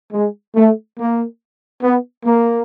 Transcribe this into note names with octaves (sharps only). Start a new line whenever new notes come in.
G#3
A3
A#3
B3
A#3